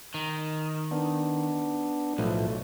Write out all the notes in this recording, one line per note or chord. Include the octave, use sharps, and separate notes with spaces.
D#3
B3 D4
B1 A2 F3 A3